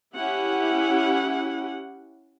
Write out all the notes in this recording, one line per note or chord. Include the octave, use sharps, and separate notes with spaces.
C#4 E4 G4 F#5